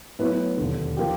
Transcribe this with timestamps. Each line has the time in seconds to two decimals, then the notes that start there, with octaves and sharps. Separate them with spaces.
0.19 A2 F#3 B3 E4 B4
0.57 E1 D#2 D3
0.97 F3 A#3 G4